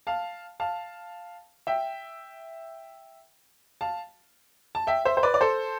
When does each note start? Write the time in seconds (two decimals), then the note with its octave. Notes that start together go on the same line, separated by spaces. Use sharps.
0.07 F5 A5
0.60 F5 A5
1.67 E5 G5
3.81 F5 A5
4.75 A5
4.87 E5 G5
5.05 C5 E5
5.17 C5
5.23 B4 D5
5.34 D5
5.41 A4 C5